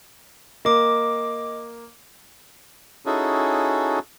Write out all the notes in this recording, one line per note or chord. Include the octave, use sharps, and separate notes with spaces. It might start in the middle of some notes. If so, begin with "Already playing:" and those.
A#3 D#5 D6
C#4 D#4 E4 F#4 G#4 A4